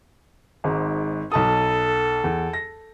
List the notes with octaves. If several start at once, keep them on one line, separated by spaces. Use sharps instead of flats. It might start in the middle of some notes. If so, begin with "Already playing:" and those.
G#1 G#2
B1 A4 A5 D#6
E2
A#6